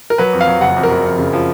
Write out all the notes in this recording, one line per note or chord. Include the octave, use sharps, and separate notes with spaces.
A#4
F#3 B4
F2
F5
F#3
F#1 F#5
F2
A#4
F#1
F2
C#3
F3